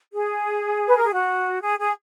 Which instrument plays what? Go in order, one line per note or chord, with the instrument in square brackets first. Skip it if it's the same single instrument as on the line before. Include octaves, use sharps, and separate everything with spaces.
[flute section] G#4
B4
A#4
G#4
F#4
G#4
G#4